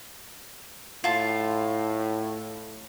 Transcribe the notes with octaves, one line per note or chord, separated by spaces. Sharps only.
A2 F4 A5 C6